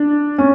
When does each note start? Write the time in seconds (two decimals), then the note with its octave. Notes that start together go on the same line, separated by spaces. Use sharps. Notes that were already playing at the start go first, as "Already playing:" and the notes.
Already playing: D4
0.38 C#4